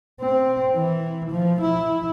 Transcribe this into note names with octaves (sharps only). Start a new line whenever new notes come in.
C4
E3
F3
E4